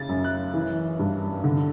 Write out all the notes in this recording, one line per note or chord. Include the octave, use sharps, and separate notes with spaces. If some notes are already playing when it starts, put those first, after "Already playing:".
Already playing: C#3 A6
F#2
F#6
E3
G2
D3